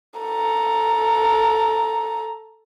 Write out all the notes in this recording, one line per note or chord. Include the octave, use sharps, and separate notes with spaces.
A4 A#5